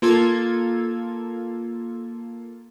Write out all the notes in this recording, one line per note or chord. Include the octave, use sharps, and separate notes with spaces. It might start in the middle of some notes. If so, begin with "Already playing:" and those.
A#3 F4 A4 G#6